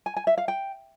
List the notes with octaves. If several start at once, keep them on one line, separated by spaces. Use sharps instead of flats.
G#5
G#5
E5
F5
G5